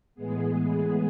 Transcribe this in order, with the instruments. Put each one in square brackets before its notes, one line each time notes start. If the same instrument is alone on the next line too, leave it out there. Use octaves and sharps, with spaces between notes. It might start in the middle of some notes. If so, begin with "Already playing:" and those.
[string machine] A2 E3 G#3 B3 G#4